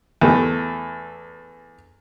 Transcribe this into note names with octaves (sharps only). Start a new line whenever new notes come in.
E2 A3